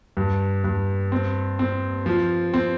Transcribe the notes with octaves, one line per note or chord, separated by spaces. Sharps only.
G2
G2
C4
C4
F3
C4